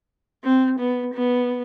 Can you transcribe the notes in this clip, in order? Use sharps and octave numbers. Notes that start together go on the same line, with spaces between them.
C4
B3
B3